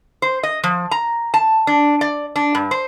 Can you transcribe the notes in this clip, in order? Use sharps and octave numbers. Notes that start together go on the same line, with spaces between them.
C5
D#5
F3
A#5
A5
D4
D5
D4
G2
C5